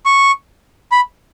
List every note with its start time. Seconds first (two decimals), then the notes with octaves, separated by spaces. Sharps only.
0.06 C#6
0.92 B5